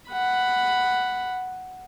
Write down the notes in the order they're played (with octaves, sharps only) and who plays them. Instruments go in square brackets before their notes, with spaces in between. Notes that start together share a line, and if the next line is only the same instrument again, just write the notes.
[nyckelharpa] F#5 B5